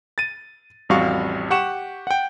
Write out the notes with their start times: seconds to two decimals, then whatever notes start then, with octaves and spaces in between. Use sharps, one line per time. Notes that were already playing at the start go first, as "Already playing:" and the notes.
0.18 A6 D#7
0.89 A1 F2 G3 F#4 F5 C#6
1.50 G4 F#5 C#6 E7
2.07 F#5 G5